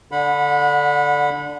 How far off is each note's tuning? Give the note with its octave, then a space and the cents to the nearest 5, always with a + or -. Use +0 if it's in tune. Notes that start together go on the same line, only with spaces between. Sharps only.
D3 +0 F#5 -35 B5 +0